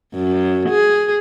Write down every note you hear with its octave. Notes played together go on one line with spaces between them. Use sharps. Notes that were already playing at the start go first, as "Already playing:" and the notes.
F#2
G#4